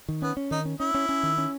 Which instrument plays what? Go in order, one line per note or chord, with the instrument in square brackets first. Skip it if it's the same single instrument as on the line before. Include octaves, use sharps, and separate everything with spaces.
[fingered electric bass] D#3
[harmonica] B3 [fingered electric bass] C#4
[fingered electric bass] C#4
[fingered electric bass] D#3 [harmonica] D#4
[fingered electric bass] C#4
[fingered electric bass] C#4 [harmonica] E4
[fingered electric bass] C#4
C#4
D#3
C#4